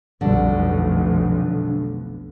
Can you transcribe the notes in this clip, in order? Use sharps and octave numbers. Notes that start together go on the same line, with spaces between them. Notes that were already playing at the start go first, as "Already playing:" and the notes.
F1 B1 D3 G3